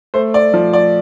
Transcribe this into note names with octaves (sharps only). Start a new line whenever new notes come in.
A3 C5
D5
F3
D5